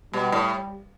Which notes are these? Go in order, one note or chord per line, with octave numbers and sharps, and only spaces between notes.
B2 G3
A2